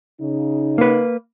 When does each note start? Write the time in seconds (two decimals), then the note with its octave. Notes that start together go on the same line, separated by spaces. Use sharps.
0.21 C#3 D#4
0.78 A#3 B4